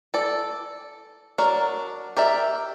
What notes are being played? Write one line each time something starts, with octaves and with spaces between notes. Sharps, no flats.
A4 D5
F#3 D4 A#4 D5
G4 A#4 D5 E5